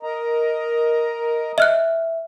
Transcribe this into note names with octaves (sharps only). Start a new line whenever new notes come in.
A#4 D#5 A#5
D#5 E5 F6 F#6